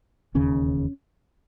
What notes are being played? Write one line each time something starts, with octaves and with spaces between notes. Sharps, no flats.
E1 D#2 C#3 C#4